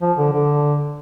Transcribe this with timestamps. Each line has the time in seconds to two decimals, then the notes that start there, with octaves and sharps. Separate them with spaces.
0.02 F3
0.18 D3
0.33 D3